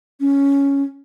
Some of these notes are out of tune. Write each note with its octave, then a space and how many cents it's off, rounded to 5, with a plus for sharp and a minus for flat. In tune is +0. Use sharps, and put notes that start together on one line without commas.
C#4 +5